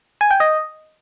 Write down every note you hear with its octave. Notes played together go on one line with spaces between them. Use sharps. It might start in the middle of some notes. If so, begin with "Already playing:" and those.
G#5
G5
D#5